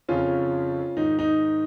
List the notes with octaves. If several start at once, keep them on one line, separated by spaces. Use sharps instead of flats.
F2 C#3 C#4 F4
G#2 D#3 D#4
D#4